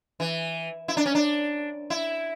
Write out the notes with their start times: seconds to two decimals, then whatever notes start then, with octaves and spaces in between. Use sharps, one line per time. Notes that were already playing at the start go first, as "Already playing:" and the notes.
0.20 E3
0.88 E4
0.97 D4
1.06 C#4
1.15 D4
1.90 E4